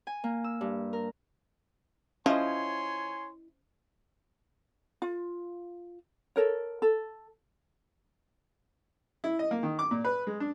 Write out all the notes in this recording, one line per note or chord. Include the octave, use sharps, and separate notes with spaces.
G#5
A#3
E6
G2
A#4
F3 C#4 E4 C#5 D#5 G#5 C6
F4
A4 A#4 C#5
A4
E4
D#5
A#3
D#3
D6
A#2
B4
G#3
D4